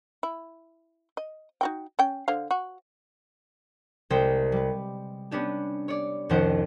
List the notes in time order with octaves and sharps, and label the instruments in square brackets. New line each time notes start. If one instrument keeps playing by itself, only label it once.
[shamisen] E4
D#5
D#4 F#4 G5
C#4 G5
D3 C5 F5
F#4
[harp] C2 G#3 C5 G5
G3 B4
B3 C#4 D4 G4
C#5 D5
C2 F2 D#3 C#4 C5 F#5